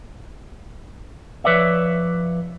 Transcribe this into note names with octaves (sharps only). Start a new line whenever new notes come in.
F3 B4 C#5 D5 E5